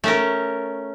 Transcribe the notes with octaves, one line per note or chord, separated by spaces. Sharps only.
A3 C#4 A#4